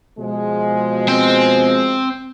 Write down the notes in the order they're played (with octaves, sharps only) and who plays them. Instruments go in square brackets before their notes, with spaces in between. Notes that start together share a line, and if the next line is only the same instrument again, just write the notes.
[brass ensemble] B2 F3 G#3
[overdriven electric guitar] C4